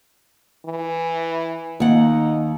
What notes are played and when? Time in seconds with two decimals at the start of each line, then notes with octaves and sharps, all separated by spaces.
0.65 E3
1.80 D#2 D#4 F#5